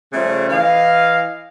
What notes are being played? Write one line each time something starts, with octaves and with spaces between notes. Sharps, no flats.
C#3 F3 G3 A3
E3 D#5 F5